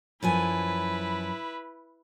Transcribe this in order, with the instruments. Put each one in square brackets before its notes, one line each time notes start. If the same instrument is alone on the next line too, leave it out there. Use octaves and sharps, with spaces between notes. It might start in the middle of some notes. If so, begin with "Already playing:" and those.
[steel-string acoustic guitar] F#2 F3 G#5 [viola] E4 B4